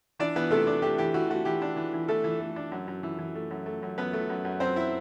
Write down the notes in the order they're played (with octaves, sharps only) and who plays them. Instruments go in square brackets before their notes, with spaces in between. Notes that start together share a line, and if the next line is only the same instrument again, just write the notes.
[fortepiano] E3 D4 D5
E3 B3 B4
C3 A3 A4
D4
A3 G4
E3 G4
E3 F#4
A3 F#4
E3 G4
D4
E3
E3
E3 A3 A4
E3
A3
D4
F#2
F#2
E3
E3
A3
F#2
A3
F#2
F#2 B3 B4
A3
F#2
F#2
F#2 C4 C5
E4 E5